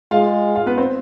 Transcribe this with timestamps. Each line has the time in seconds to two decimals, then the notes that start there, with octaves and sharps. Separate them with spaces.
0.11 G#3 F4 F5
0.55 F4 F5
0.66 B3 B4
0.77 C4 C5